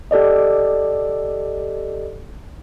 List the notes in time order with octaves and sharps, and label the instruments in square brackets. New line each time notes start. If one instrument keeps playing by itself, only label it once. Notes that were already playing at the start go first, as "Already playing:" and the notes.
[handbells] G4 A4 D5 D#5